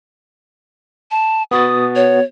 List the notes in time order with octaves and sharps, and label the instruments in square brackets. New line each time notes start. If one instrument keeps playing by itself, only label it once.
[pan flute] A5
[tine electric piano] B3 F#4 A6 [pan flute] D#6
[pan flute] C#5